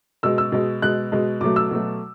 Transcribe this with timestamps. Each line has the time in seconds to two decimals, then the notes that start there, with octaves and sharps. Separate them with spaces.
0.23 B2 G#3 E6
0.38 E6
0.52 B2 G#3
0.82 B2 G#3 F#6
1.12 B2 G#3
1.41 B2 F#3 A3 D6
1.56 E6
1.71 B2 F#3 A3